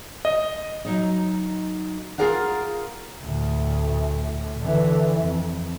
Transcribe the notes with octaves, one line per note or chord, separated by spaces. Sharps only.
D#5
F#3 D#4 D#5
F4 G#4 A#4 F5 F#5
D2 A2
D3 E3
F2